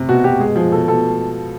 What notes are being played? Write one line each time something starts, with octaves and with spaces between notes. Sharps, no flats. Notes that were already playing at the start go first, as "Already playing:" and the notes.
Already playing: C3
B2 F#4
B2 G4
G#3 G#4
F3 G#4
B2 A4
B2 A4